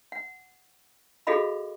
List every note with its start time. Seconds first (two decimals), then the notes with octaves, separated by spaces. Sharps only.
0.12 F#5
1.27 F#4 G#4 A4 D#5 F5 B5